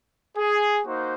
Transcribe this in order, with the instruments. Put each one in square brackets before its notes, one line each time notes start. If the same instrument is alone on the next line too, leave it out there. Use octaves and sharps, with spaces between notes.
[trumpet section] G#4
A#3 D#4 F#4 C5